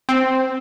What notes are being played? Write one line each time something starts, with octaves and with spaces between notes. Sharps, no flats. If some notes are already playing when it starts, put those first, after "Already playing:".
C4